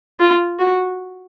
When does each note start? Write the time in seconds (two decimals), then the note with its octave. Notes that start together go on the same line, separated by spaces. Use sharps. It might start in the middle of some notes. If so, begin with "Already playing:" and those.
0.20 F4
0.59 F#4